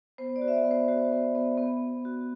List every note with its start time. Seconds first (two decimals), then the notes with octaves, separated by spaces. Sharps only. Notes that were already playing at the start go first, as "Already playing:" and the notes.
0.18 B3 C5
0.36 D5
0.42 F#4
0.48 E5
0.53 D5
0.65 B3
0.71 C5
0.88 F#4 C5
1.12 B3
1.35 B3
1.58 B3
1.82 B3
2.05 F#4